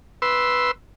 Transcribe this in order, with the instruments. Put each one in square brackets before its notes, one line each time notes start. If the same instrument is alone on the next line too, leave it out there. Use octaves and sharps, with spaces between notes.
[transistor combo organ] B4 C6 E6